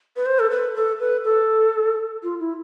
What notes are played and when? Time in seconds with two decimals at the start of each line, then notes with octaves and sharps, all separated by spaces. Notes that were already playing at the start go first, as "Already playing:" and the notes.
0.16 B4
0.26 C5
0.39 A4
0.50 B4
0.75 A4
1.00 B4
1.25 A4
2.23 F4
2.40 E4